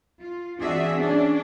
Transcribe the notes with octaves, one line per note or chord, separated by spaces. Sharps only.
F4
E3 C4 D4 F#4 G#4 E5
C#4 D4